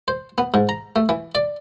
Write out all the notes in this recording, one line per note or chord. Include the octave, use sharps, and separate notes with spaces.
C5
B3
G#2
A#5
A3
E3
D5